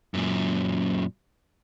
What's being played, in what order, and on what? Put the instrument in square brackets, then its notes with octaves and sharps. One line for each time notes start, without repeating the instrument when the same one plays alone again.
[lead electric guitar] F#2 A#2